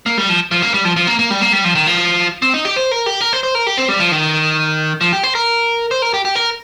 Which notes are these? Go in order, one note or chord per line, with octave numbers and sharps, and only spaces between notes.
A#3
G3
F3
F3
A#3
G3
F3
F3
A#3
A#3
G3
A#3
G3
F3
D#3
F3
C4
D#4
G4
C5
A#4
G4
A#4
C5
C5
A#4
G4
C4
G3
F3
D#3
F3
G4
C5
A#4
C5
A#4
G4
G4
A#4